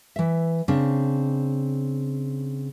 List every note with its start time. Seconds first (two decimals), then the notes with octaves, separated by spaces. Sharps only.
0.16 E3 E5
0.68 C#3 C4 D4